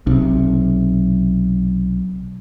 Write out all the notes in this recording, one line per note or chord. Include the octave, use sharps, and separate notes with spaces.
B1 C3